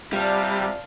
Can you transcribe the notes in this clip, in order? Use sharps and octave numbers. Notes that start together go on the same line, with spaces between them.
C3 G3 F4 D5 F5 A5